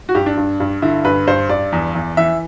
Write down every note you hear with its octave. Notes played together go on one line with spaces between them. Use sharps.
F#4
G2 G4
D4
G2
G2
D3 E4
G2 B4
G2 C5
G2 D5
E2
E2
E3 E5